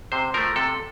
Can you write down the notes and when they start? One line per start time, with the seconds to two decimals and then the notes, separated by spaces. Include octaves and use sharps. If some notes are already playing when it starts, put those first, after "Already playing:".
0.12 C3 C5
0.34 F3 A3 A#4
0.56 C3 A4